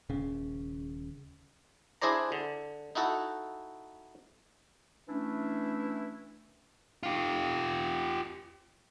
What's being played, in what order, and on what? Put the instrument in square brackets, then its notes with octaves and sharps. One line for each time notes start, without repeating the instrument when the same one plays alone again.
[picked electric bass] D#1 C#3
[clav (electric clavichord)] D4 E4 G#4 C5 D5 A#5
D3
D#4 E4 F#4 A4
[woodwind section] E3 A3 C#4 D4 E4
[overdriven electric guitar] F4 G4